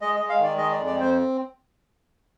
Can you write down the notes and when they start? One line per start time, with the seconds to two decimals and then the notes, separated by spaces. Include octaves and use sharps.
0.01 G#3 D#5
0.16 D#5
0.21 G#3
0.29 F5
0.39 D#3 D5
0.58 G#3 D#5
0.72 F2 D5
0.86 D5
0.96 C4 C5